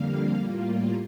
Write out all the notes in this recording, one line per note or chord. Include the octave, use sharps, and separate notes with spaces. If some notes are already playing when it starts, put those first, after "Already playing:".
Already playing: F2 D3 G3 A#3 F5
A2 G3 A#3 F4